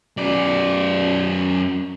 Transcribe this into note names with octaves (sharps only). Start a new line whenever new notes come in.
F#2 D5